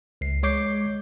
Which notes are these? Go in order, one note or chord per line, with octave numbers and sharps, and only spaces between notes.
C#2 C7
G#3 C#5 D6 G6 C7